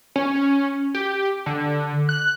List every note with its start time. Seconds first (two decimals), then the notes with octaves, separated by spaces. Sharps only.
0.16 C#4
0.95 G4
1.46 D3
2.09 F#6